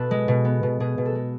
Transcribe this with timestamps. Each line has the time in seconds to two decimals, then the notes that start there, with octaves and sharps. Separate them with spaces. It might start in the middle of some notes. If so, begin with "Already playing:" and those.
Already playing: B2 A4 B4
0.11 G#3
0.28 B2
0.45 B3
0.63 B2
0.80 B2 G#4
0.98 B2
1.06 A4
1.15 G#3